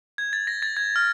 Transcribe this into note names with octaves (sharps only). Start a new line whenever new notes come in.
G#6
A6
A#6
A6
G#6
F6